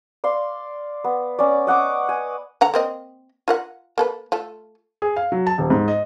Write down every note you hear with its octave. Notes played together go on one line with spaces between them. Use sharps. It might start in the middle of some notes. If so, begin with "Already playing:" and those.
D5 F5 C6
B3
C#4 D5
D#5 F#5 C#6 D6
G#5
D3 F#5 A#5
A#3 C4 D#5
F4 A#4 F#5
A#3 A4 B4
A3 F4 A4
G#4
F5
F#3
A5
D#1
G#2
D#5